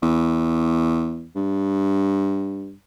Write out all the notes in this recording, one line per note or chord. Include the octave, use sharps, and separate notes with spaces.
E2
G2